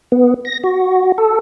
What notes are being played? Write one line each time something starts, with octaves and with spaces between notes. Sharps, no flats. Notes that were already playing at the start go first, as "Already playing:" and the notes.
B3
A#6
F#4
A4